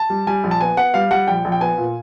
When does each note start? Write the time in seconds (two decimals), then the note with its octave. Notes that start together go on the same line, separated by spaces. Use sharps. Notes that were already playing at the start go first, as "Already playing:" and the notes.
Already playing: A5
0.10 G3
0.27 G3 G#5
0.44 A#1
0.51 A5
0.61 B3 G#5
0.77 B3 F#5
0.94 G3 F5
1.11 G3 F#5
1.27 A#1 G5
1.45 A#1
1.52 G5
1.61 B3 G#5
1.78 A#2